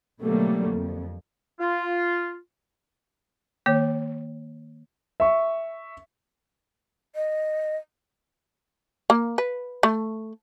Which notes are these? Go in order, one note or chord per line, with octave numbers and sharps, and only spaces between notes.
B2 D3 F#3 G3 A3 A#3
F2
F4
D#3 A#3 C#5
E5 C#6
D#5
A#3
B4
A3